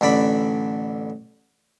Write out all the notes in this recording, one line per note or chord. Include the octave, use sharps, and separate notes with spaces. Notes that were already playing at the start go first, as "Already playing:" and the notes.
A1 D3 D5 B5